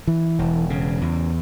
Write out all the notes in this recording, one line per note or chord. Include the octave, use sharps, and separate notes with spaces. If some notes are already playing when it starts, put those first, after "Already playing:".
E3
E1
C#3
E2